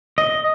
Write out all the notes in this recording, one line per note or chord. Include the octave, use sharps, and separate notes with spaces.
D#5